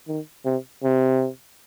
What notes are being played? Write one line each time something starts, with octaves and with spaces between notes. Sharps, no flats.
D#3
C3
C3